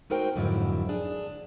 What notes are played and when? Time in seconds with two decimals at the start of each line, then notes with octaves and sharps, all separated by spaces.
0.10 A3 D#4 F#4 A#4 C5 G5
0.36 F2 G#2 D3 F#3 E4
0.89 D4 G#4